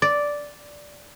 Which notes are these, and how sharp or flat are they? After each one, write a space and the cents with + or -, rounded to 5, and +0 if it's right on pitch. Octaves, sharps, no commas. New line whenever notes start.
D5 -5